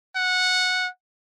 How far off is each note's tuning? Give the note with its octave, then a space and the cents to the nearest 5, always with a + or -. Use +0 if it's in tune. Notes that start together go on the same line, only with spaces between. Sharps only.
F#5 -15